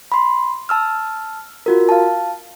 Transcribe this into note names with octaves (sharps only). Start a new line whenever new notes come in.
B5 C6
A5 E6 F6
F4 F#4 A#4
F5 A5